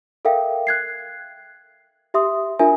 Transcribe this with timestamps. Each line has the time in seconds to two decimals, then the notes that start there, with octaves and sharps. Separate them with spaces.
0.25 A4 A#4 E5 F5 G5
0.67 F#6 G#6 C7
2.14 G4 E5 C6 D#6
2.59 D4 F4 A#4 E5 G#5